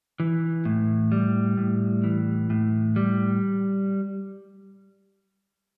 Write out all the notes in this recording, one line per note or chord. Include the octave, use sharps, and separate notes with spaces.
E3
A2
G3
A2
E3
A2
G3